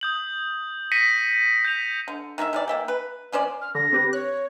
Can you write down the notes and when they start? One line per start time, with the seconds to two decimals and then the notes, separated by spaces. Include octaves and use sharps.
0.01 D#6 G6 F#7
0.92 A#6 B6 C#7 D#7
1.65 G6 B6 F7
2.08 D3
2.38 D#3 A3 E4 E5
2.53 C3 E3 D5
2.68 A#3 E5 G5
2.88 B4
3.32 F3 C#4 C5 D5
3.61 F6
3.75 D3 A#6
3.93 C4 G4 B4
4.13 C#5 F#6